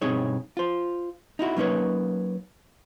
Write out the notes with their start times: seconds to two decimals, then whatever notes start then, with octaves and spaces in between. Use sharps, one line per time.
0.02 G2 B2 C4 D#4 G#4 C#5
0.57 F4 C5
1.39 D#4 E4 F#4
1.57 F#3 A#3 C#4 D#4 B4 C#5